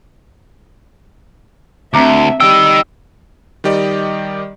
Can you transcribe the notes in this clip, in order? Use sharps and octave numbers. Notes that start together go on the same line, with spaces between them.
D2 C4 E5 A#5 D6
G3 D#4 G5 E6
D#3 G3 G4 D5 D#5